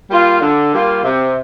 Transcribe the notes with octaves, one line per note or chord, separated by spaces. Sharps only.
G3 A#3 F4
D3
G3 A#3 F4
C3